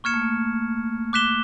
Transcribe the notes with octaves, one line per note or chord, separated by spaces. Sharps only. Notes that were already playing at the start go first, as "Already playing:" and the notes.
A#3 C#6 F6 G#6 C#7 E7
A3
A#3
D6 F#6 B6 E7 G7